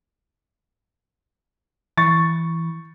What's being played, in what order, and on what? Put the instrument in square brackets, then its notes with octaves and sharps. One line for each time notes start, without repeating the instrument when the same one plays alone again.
[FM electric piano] E3 [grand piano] C#6 A6